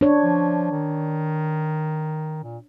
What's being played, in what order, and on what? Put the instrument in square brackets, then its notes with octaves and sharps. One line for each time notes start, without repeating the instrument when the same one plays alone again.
[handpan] D4 C#5
[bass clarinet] F3
D#3
A#2